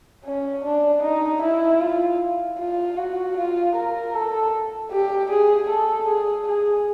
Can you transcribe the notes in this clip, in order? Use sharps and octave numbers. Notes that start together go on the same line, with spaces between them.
C#4
D4
D#4
E4
F4
F4
F#4
F4
A#4
A4
G4
G#4
A4
G#4
G#4